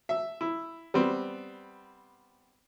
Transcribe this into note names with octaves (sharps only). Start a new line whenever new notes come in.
E5
E4
G3 B3 C4